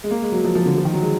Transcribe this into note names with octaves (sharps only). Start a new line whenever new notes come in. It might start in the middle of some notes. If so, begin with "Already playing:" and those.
G#3
A#3
G#3
F#3
F3
F3
D3
F3
D#3
F#3
G#3